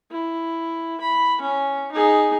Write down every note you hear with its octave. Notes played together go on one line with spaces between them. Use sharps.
E4
B5
C#4
D#4 G#4